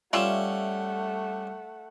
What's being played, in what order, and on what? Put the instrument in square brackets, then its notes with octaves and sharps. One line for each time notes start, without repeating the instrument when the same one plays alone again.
[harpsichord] G3 C#4 [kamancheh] A3 F#5 [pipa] F4 E5